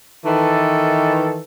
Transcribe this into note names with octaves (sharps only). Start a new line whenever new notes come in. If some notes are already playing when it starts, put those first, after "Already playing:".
D#3 E3 A4